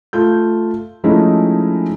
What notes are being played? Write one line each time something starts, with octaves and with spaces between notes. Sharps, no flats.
A3 F4 A4 G6
F3 G#3 A3 C#4 D#4 E4